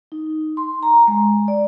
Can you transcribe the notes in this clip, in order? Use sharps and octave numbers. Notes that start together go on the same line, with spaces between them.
D#4
C6
A#5
G#3
D5